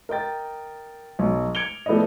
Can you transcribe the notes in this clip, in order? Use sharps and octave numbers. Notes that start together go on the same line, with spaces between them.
A#4 D#5 G5 A6
B1
G#6 C#7 D7 F7 G7
F3 A3 B3 E4 D5 D#5